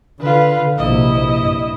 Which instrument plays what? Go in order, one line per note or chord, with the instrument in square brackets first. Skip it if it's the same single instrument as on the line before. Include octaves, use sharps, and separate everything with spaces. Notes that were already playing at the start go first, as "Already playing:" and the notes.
[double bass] D3 [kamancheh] F4 B4
[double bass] A#1 C3 [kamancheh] E4 D#5
[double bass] G2